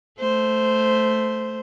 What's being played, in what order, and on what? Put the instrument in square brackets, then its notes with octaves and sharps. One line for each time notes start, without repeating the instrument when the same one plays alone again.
[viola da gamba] A3 C5